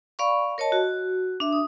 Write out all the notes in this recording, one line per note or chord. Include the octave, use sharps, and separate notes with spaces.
D5 F5 B5 C#6
A#4 C#5 D#5 A5
F#4
D4 E5
D#6